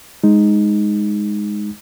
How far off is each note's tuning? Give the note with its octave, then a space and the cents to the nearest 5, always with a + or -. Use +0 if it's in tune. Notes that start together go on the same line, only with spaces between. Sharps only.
G#3 +0 D#4 +0